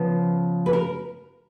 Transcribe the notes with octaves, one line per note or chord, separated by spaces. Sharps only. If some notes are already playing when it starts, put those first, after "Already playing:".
Already playing: C#3 F3 B3
B4
A#4